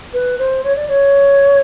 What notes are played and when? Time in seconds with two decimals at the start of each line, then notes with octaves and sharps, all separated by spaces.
0.14 B4
0.39 C5
0.64 C#5
0.76 D5
0.88 C#5